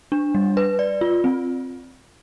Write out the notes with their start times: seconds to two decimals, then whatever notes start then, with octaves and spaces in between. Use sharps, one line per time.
0.12 D4
0.35 G3
0.57 B4
0.79 D5
1.01 F4
1.24 C4